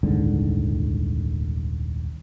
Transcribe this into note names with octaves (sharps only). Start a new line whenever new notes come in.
D#1 C2 G#2 D3